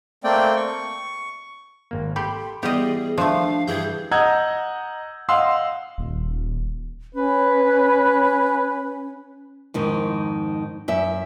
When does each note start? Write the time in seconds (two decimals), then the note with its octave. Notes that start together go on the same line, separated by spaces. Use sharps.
0.24 A3 A#3 C4 D5 G5
0.56 C#6
1.91 G#1 A#3
2.16 G4 A4 G5 B5 C6
2.63 E3 G3 B3 G4 G#4 D5 D#5
3.18 F3 A3 D4 F5
3.67 G2 E3 G#4 G6 G#6
4.11 D#5 F#5 A#5 E6 G6 G#6
5.29 D#5 F5 F#5 C6 E6
5.98 D#1
7.15 C#4 B4
9.74 F2 G#2 D#3
10.88 F#2 E5